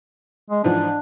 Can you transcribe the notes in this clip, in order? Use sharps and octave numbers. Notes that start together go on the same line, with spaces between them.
G#3
G#2 E3 F3 D4